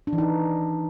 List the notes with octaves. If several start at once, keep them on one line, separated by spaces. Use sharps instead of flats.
D4
E3
D#4